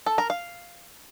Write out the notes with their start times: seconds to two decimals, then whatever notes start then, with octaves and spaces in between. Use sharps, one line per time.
0.06 A4
0.18 A#4
0.30 F5